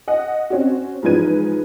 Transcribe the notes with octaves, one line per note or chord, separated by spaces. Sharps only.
D#5 F#5
C4 C#4 F#4
G#2 E3 F3 B4 G#6 D#7